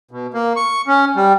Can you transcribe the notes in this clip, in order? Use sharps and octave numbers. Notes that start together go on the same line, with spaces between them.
B2
A#3
C#6
C#4
G3